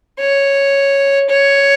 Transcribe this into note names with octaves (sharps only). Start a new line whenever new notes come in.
C#5
C#5